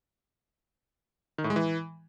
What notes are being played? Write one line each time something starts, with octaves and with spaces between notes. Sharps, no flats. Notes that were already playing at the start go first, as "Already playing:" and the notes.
D#3
A2
G#3
E3